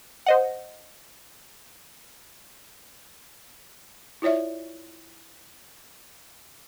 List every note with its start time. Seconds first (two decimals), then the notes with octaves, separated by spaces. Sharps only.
0.26 C5 D#5 F#5
4.22 E4 F4 C#5 D5 E5